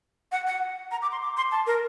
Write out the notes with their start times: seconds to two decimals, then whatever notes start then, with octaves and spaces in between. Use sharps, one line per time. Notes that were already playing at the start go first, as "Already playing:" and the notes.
0.32 F#5
0.47 F#5
0.91 A#5
1.02 D6
1.12 C6
1.22 D6
1.37 C6
1.51 A5
1.67 A#4